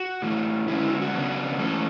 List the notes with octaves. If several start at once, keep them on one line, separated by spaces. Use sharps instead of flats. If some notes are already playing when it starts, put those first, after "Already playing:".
Already playing: F#4
A2 E3 A3
D3 G#3 C#4 E4
E4
F#4
F#4
C#3 F#3 B3 D4
G#2 E3 A3 C#4 A4